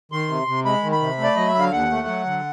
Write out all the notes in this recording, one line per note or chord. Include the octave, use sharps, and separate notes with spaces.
D#3 C6
C3
C3
G#3 B5
D#3
B5
C3
A3
D5
F#3 D#5
E5
D3
F5
D#2 F#5
A3
F#3
D3